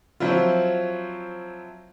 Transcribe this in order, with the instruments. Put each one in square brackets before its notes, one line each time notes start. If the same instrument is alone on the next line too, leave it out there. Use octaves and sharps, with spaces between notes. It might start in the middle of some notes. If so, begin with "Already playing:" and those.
[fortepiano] F3 F#3 C4 E4 F4